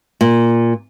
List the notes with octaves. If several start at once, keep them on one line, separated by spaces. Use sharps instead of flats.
A#2